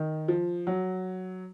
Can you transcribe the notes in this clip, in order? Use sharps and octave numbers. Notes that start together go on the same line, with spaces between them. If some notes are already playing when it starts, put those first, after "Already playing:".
Already playing: D#3
F3
F#3